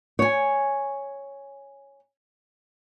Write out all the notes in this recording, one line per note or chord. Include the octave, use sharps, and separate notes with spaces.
C#5 G#5